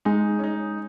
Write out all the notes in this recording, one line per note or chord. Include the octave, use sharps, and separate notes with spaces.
G#3 D#4
C#4
D#4